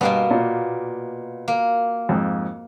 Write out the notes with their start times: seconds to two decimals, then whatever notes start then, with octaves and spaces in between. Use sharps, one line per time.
0.01 G2 B2 A#3 B3
0.31 A#2
1.48 A#3
2.09 F2 G#2